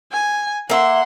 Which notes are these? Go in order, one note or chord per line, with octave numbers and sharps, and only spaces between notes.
G#5
A#3 E5 F#5 C6